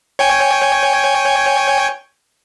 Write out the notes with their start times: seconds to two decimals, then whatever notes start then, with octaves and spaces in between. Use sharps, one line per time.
0.19 C#5 G5 G#5